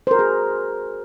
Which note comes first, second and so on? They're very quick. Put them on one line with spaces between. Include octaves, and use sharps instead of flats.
C5 A#4 F#4 G#4